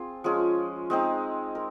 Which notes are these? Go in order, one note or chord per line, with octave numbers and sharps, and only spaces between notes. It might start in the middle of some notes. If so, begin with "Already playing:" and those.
Already playing: C4 F4 G#4
F3 G#3 C#4 G#4
G#3 C4 D#4
A#4